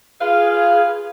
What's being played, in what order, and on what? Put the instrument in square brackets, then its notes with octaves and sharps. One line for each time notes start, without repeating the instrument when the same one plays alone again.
[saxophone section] F4 B4 F5 [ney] G#4